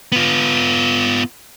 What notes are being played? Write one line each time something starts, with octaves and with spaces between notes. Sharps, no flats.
B3 F4